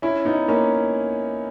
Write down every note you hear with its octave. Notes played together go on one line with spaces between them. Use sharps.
C#4 E4
B3 D#4
A#3 C#4